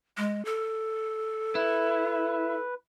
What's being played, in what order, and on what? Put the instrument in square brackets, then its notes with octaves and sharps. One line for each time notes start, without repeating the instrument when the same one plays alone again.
[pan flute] G#3
A4
[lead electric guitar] E4 [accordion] B4